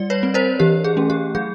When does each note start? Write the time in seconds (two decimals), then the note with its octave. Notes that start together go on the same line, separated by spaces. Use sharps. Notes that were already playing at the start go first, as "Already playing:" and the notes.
Already playing: G3 D5
0.10 B4 C#5
0.23 C4
0.34 A#4 C5
0.60 E3 G4
0.84 G#4
0.97 A3 C#4
1.10 G4
1.35 F#3 G#4